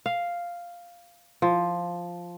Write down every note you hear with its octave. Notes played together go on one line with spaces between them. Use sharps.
F5
F3